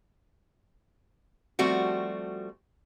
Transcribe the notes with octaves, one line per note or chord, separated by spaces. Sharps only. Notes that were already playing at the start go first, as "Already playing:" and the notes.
F3 G3 A3 C4 F#4